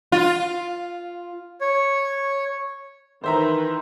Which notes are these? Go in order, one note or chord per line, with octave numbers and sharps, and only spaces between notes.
F4
C#5
D#3 E3 B4 C5 E5 A#5